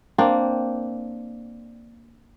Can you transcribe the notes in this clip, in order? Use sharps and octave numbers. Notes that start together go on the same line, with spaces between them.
A#3 C4 D4